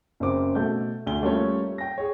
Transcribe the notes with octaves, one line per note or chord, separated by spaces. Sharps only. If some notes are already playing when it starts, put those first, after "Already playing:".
F#1 C#3 C4 D6
B2 A3 G6
D2 G7
G3 A3 A#3 C#4 F4 C#5
G5 A#6
G#4 C#5